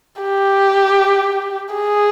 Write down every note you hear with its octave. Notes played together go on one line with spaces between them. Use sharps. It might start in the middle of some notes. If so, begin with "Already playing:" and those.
G4
G#4